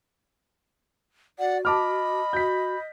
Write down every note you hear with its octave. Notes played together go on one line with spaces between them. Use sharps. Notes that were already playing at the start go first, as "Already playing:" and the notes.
F#4 D5 F#5
D#5 A5 B5 D6 F6
F#4 G6 B6